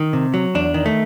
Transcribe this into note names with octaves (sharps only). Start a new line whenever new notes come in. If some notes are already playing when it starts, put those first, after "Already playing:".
Already playing: D#3
C3
F#3
E2 D4
D#3
A3